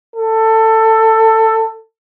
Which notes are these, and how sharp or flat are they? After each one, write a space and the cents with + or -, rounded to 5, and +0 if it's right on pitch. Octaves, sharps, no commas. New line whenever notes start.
A4 +15